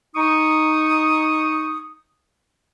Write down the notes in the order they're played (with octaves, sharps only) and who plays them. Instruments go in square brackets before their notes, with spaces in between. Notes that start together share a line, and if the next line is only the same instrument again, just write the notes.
[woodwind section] D#4 C#6 D#6